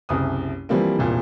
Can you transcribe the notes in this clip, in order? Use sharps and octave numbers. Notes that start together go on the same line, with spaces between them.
F#1 C2 D#6
E3 F3 G3 A#3 C4
E1 C2 A#2